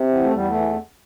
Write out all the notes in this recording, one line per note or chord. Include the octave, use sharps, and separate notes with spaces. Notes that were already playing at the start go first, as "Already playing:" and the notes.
Already playing: C3
E2
A3
E2 G3
A3
E3